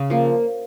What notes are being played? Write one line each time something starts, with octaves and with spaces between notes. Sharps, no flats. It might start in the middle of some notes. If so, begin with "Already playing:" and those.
Already playing: C#3 F5
F3 A#3